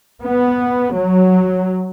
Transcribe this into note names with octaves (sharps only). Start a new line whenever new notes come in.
B3
F#3